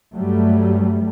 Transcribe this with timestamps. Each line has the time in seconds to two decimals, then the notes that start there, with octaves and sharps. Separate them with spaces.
0.14 G2 F#3 G3 A3